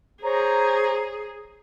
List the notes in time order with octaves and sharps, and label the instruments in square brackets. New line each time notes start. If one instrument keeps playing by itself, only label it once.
[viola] G#4 [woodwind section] C5 C#5 A#5